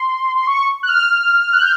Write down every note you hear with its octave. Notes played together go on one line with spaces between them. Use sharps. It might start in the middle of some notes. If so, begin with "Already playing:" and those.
Already playing: C6
C6
C#6
F#6
F6
F#6
G6